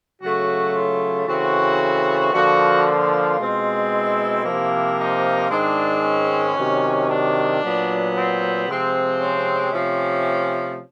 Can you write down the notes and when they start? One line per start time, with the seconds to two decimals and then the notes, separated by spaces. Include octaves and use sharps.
0.21 C#3 F#3 A3 F#4
0.75 F4
1.27 C#3 E3 A3 C4 F#4
2.32 D3 F3 A#3 F#4
2.86 F4
3.38 B2 G#3 C4
3.92 E4
4.44 C3 F3 A#3
4.97 D#4
5.49 G#2 D#3 G#3 C4 D4
6.02 C#4
6.56 C3 D#3 F#3
7.09 D4
7.61 A#2 F#3 B3
8.15 C4
8.67 C3 F3 G#3 C4
9.20 C#4
9.72 C3 F3 A3